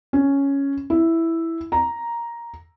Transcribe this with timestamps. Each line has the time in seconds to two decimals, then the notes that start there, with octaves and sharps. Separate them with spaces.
0.13 C#4
0.90 E4
1.72 A#5